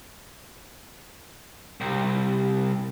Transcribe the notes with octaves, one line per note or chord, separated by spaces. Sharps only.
C2